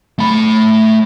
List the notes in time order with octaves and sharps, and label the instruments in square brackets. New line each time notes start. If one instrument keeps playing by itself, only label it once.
[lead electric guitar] A3 B5